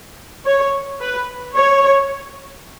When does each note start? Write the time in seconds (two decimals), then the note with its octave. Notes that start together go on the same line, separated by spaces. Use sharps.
0.46 C#5
1.01 B4
1.55 C#5